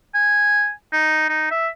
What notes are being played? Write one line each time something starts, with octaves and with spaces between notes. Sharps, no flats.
G#5
D#4
D#4
E5